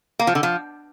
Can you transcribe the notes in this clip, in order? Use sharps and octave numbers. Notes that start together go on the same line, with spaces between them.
A#3
F3
D3
F3